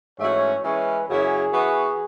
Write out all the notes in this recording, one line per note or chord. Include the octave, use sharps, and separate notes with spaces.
G#2 E3 A3 C#4 F#4 C#5
E3 G#3 C#4 B4
F#2 C#3 F#3 C#4 E4 G#4
E3 B3 F#4